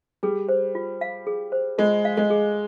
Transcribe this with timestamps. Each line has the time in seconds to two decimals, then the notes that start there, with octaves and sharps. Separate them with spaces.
0.23 G3 G#4
0.49 C5
0.75 F4
1.01 F5
1.27 G#4
1.52 C5
1.78 G#3 F4
2.05 F5
2.17 G#3
2.30 G#4